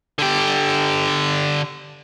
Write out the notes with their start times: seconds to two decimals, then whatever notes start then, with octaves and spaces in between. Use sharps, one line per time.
0.19 D3 G4